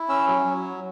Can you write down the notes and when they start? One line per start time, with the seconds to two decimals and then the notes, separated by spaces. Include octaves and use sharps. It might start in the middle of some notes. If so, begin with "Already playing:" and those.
Already playing: E4
0.08 C#4 E6
0.27 F#3
0.45 F#3